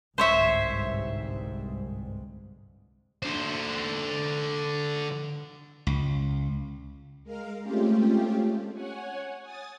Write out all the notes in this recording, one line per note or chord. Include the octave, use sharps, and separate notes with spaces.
G1 C2 G#2 C5 C#5 E5
D3 C5
C#2
G#3 A#4 F5
G#3 A3 C4 C#4 F4 G4
C#5 F#5 G#5
G#5 D#6 A6